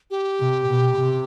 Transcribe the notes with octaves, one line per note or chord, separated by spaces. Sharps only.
G4
C3
B2
C3